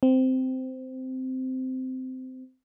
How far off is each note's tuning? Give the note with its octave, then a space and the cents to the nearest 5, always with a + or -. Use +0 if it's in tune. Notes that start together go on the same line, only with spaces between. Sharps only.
C4 -15